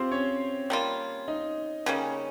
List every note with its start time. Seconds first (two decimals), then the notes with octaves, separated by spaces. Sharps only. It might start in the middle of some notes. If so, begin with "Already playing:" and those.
Already playing: C4 F4 G4 C5
0.11 C#4 C#5
0.70 G3 A#3 F4
1.28 D#4 D#5
1.86 C#3 G3 A#3 C#4